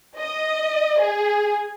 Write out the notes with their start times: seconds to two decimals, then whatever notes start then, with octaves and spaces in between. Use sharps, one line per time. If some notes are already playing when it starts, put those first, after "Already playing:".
0.17 D#5
1.00 G#4